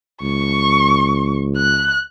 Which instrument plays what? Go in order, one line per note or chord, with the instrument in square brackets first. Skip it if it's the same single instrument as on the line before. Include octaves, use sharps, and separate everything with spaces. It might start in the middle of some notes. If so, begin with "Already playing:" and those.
[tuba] C#2 [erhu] C#6
[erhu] F#6